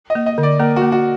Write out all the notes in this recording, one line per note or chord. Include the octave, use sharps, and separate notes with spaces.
D#5
A#3
D#5
D3
D5
A#3 A#4
F#4
A#3
F#4